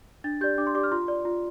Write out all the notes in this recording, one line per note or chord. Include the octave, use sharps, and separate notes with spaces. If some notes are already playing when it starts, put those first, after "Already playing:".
D4 A6
G4 D5 G6
D4 D6
C6
G4 D5 D6
F6
F4 C6
D5
F4